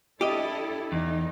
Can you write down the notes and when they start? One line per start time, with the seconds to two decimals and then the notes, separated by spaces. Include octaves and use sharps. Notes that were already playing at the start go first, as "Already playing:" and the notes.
0.21 D4 E4 G4 A4 D#5
0.92 E2 D#4